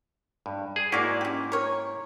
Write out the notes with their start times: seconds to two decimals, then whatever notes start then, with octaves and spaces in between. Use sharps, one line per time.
0.46 G2
0.76 G#4
0.92 G#2 A#3 E4 F#4 D5
1.21 C#4 G4
1.52 A#4 C#5